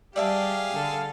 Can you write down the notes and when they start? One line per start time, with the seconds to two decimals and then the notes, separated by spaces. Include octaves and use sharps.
0.16 G3 G4 G#4 D5 E5 F5 A5
0.74 D3 A4